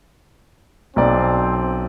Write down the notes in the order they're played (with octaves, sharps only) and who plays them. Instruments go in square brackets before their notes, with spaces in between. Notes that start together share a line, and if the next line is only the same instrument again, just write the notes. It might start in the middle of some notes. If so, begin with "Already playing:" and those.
[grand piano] B1 D5 [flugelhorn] C4